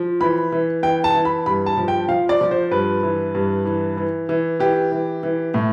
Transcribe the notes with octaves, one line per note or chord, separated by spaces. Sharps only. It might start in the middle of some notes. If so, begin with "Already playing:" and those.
Already playing: F3
E3 B5
E3
E3 G5
A5
E3
B5
G2 B5
A5
F3
G5
F3 F5
D5
F3
C5
G2 B4
E3
G2
E3
E3
E3
E3 G4
E3
E3
A2